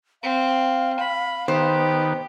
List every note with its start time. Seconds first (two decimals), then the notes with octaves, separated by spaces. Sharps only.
0.23 C4 F5
1.00 B5
1.48 D#3 B3 G4 C5